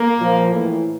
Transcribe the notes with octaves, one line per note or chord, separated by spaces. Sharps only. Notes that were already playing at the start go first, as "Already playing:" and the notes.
Already playing: A#3
A#2 F3
A2 E3